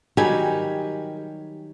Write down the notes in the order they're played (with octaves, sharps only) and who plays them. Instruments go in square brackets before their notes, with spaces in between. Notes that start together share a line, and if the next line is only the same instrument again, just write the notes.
[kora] D#3 F#3 G3 [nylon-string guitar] G4 G#5